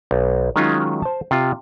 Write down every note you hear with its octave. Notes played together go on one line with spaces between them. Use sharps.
B1
D#3 F#3 G#3 C#4 D#4 F4
C5 A5
C3 F4